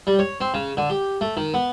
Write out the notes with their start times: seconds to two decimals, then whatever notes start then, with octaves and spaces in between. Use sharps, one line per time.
0.07 G3
0.19 C#5
0.41 C4
0.54 C#3
0.77 D3
0.90 G4
1.21 A3
1.37 D#3
1.54 B3